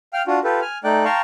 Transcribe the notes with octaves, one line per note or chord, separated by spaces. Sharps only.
F5 G5 F6
D4 F4 F#4
F4 G4 A4 B4
G#5 F6
A3 D#4 D5 G5 F#6
F5 G5 A5 A#5 C6 C#6